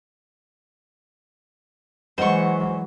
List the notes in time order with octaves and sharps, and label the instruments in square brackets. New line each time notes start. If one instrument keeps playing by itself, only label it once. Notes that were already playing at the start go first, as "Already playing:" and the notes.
[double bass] E3 G#3 [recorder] F#3 [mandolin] C5 C#6 [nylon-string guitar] D#5 F#5